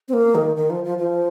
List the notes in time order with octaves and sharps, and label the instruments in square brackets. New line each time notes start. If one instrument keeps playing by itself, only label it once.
[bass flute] C4
A#3
D#3
D#3
F3
F3
F3